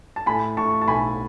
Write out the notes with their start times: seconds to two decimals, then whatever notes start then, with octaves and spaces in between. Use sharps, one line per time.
0.16 A5
0.26 A2 G#5 B5
0.57 A2 A5 C#6
0.82 A5
0.88 B1 G#5 B5